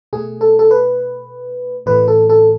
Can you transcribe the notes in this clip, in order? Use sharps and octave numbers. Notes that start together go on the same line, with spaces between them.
B2 A3 G#4
A4
A4
B4
A2 E3 A3 B4
A4
A4